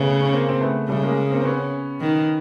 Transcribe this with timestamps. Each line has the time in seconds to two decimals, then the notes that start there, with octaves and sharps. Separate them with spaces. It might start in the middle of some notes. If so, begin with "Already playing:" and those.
Already playing: C#3 A3 B3
0.21 C#4
0.33 A#3 C4
0.49 C4
0.61 A3 B3
0.89 C#3 G3 A3
1.03 G#3 A#3
1.30 A#3 C4
1.41 C4
1.45 B3 C#4
2.01 D#3